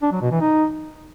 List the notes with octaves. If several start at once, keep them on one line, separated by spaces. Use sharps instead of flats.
D4
F#3
B2
E3
D#4